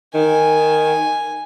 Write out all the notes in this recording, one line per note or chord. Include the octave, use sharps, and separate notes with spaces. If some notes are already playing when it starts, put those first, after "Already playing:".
D#3 G#5